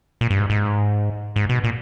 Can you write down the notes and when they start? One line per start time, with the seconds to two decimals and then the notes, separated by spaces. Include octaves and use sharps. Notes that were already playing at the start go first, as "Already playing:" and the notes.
0.21 A#2
0.30 G2
0.40 G#2
0.50 G#2
1.36 G#2
1.49 B2
1.64 A#2